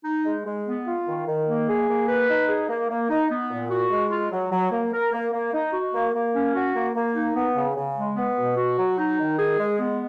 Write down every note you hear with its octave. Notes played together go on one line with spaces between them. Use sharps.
D#4
G#3
G#3
B3
F4
D#3
D#3
A#3
G#4
A#3
B4
D#4
G#4
A#3
A#3
D#4
B3
A#2
F#4
G#3
F4
F#3
F#3
A#3
A#4
A#3
A#3
D#4
F#4
A#3
A#3
C#4
F#4
A#3
A#3
D#4
B3
C#3
C#3
G#3
B3
B2
F#4
F#3
D#4
D#3
G#4
G#3
B3